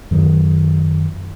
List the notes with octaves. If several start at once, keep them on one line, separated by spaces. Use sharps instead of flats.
F#2 D#3 F#3